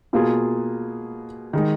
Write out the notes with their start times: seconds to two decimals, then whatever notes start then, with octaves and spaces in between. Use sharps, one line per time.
0.13 B2 A#3 F4 G#4
1.53 D#3 G#3 D#4